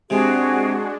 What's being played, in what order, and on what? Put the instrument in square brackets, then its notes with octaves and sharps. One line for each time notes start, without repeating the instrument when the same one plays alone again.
[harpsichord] C3 [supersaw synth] G#3 D4 [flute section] F#4 G#4